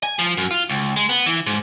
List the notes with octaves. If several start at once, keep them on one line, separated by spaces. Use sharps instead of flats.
G#5
F3
F#2
F4
C#2
G#3
B3
E3
G#2